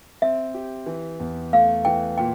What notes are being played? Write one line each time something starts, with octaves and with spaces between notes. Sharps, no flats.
C4 E5
G4
E3
E2
A3 F5
E3 G5
A#2 G5